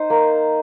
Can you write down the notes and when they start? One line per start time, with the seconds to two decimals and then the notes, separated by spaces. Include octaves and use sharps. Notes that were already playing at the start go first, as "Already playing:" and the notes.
Already playing: D#4 C5
0.10 A#3